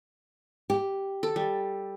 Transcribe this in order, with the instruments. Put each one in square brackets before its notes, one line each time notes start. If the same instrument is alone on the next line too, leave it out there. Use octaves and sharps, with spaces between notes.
[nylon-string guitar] G4
[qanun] A4
G3